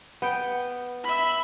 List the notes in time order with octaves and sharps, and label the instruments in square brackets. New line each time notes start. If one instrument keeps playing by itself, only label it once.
[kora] B3 G5
[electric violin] E5 B5